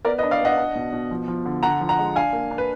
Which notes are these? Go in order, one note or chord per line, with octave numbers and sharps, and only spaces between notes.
B3 A#4 D5
B4 D#5
D4
D5 F5
B3 D#5 F#5
D4
B2
B2
F3
F3
D3
D3 F#5 A#5
F3
F#5 A#5
G#3
D4 F5 G#5
A#3
D4
B4